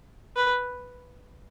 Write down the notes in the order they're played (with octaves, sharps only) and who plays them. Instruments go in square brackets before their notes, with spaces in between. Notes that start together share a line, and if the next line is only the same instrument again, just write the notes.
[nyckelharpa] B4